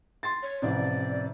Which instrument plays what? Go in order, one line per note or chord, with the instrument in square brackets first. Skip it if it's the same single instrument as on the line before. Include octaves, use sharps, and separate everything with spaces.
[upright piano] C6 A6
[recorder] C#5
[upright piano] A1 F2 C3 [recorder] D5